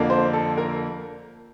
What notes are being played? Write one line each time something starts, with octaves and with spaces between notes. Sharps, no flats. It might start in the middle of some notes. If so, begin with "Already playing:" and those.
Already playing: F2 D3 F3 A#3
C5
A4
A#4